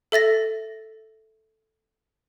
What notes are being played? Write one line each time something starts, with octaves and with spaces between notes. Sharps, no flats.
A4 E5 A6 A#6